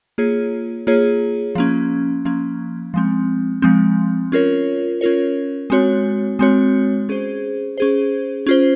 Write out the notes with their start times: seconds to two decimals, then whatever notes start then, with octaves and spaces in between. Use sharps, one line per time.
0.18 A#3 F4 G#4 C#5
0.87 A#3 F4 G#4 C#5
1.55 F3 A#3 C#4
2.25 F3 A#3 C#4
2.94 F3 G#3 C4
3.62 F3 G#3 C4
4.32 C#4 F4 A#4 C#5
5.01 C#4 F4 A#4 C#5
5.70 G#3 C4 F#4 C#5
6.39 G#3 C4 F#4 C#5
7.09 C#4 G#4 C5
7.78 C#4 G#4 C5
8.46 C#4 F4 C5